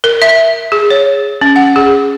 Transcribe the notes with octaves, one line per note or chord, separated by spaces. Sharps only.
A#4
E5
G#4
C#5
C#4
F#5
G#4